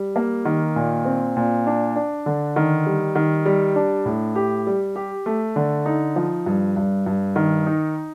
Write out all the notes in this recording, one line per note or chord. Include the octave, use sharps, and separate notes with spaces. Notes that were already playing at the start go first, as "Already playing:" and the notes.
Already playing: G3
A#3
D#3
A#2
C4
A#2
D4
D4
D3
D#3
G3
D#3
G3
D4
A2
G4
G3
G4
A3
D3
D#4
F3
G2
G2
G2
D#3
D#4